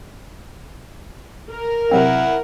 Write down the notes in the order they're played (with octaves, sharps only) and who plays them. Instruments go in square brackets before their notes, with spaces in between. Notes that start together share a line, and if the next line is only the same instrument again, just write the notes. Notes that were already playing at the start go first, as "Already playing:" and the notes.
[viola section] A#4
[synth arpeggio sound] C3 F#3 C4 [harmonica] E4 F#5